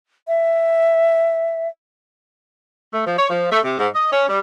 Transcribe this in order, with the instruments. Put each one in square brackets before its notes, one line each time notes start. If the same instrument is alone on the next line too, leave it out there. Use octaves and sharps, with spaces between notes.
[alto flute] E5
[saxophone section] A3
F3
C#5
F3
A3
C3
G#2
D#5
C#4
G3